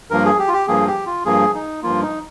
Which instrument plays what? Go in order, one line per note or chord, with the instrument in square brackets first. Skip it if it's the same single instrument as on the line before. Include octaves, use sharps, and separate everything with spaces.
[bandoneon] G2 F3 A#3 A#4
G#4
G4
F4
G4
G2 F3 A#3 G#4
G4
F4
G2 F3 A#3 G#4
D#4
G2 F3 A#3 F4
D#4